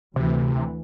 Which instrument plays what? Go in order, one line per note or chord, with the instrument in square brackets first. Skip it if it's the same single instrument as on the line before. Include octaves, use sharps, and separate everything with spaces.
[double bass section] D2 E3 [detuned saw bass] C3